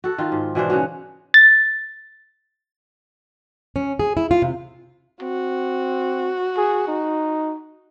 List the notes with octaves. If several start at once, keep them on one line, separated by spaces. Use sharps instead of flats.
F#4 A4
D#3 F4
G#2
B2 E3 D4 C5
C#3 C#4 F#4
A6
C#4
G#4
E4
F4
C3
C4 F#4
G#4
D#4